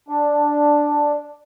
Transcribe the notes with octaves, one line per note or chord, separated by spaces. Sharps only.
D4